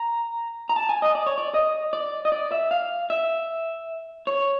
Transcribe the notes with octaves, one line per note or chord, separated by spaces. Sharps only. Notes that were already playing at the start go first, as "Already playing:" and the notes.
Already playing: A#5
A#5
A5
G#5
D#5
D5
C#5
D5
D#5
D5
D#5
D5
E5
F5
E5
C#5